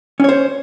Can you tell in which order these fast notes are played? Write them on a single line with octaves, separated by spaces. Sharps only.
C#4 C#5 C5